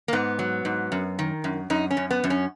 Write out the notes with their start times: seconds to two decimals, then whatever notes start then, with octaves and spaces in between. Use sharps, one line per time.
0.08 A#3
0.13 G#2 B3
0.39 F#3
0.65 G#2
0.92 F#2
1.19 D#3
1.44 F#2
1.70 F#2 D#4
1.91 C#4
1.97 F#2
2.11 B3
2.24 F#2
2.30 C#4